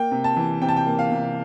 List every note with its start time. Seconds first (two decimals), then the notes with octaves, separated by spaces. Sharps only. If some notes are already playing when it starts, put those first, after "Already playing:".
Already playing: A#3 G5
0.11 C3
0.24 A5
0.36 E3
0.62 C3 G5
0.69 A5
0.76 G5
0.87 A#3
0.99 F5
1.11 C3